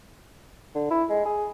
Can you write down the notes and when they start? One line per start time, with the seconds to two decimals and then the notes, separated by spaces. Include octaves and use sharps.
0.75 D3
0.91 E4
1.10 G#3
1.25 G#4